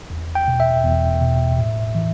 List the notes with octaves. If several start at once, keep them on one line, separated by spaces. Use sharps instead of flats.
E2
G5
B2
E5
E2
B2
A2
E3